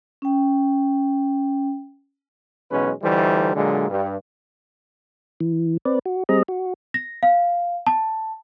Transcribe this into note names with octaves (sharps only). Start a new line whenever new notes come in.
C#4 G5
B1 E2 B2 G#3 C#4 B4
D2 E3 G3 A3 D#4 C5
A#2 D3 F#3 G#3
G2
E3
C4 B4 D5
F#4
G3 C4 G#4 D#5 A#5
F#4
A#6
F5
A5